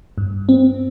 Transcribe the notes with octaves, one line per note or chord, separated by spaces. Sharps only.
G2
C4